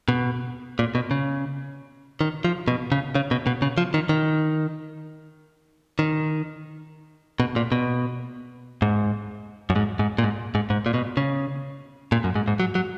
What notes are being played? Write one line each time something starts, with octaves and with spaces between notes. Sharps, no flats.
B2
A#2
B2
C#3
D#3
F3
B2
C#3
C#3
B2
B2
C#3
F3
D#3
D#3
D#3
B2
A#2
B2
G#2
F#2
G#2
G#2
A#2
G#2
G#2
G#2
A#2
B2
C#3
A#2
F#2
G#2
G#2
F#3
F#3